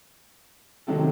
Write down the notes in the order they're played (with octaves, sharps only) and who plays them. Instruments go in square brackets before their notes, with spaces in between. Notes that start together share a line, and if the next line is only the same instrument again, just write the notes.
[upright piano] C3 D#3 F#3 A3 A4